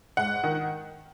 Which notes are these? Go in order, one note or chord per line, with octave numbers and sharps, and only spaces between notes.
G#2 F#5
D#3